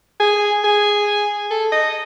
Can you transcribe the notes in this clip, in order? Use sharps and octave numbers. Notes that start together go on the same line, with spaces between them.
G#4
G#4
A4
D#5